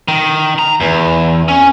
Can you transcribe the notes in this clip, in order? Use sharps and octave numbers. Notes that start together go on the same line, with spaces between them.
D#3
A#5
E2
C#4